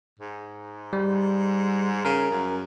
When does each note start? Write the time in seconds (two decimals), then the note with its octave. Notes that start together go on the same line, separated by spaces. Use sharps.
0.19 G#2
0.93 G3
2.05 C#3 A#4
2.31 F#2